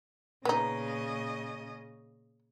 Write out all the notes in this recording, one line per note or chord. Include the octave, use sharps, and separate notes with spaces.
A#2 C#3 B3 D#4 D#5